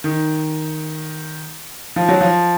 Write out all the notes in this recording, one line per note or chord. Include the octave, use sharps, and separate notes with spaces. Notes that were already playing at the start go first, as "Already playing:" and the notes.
D#3
F3
F#3
F3